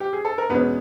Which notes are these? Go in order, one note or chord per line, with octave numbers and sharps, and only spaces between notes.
G4
G#4
A4
A#4
E2 B2 G#3 B3 C#4 B4